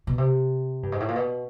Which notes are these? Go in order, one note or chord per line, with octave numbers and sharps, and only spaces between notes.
B2
C3
G2
G#2
A2
A#2
B2